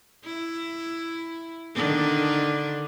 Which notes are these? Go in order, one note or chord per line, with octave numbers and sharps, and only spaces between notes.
E4
D3 D#3 D4